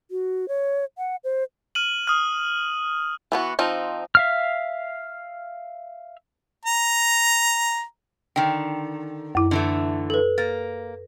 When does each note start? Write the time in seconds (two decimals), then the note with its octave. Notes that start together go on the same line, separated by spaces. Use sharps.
0.11 F#4
0.48 C#5
0.98 F#5
1.24 C5
1.75 F6 D#7 F#7
2.07 D#6 F6
3.32 E3 B3 F#4
3.59 F3 C4 D#4
4.15 E5 F5 F6
6.65 A#5
8.36 D3 D#3 G5
9.35 F#2 E4
9.51 D3 E3 A3
10.10 A4 B4
10.38 A#3 A6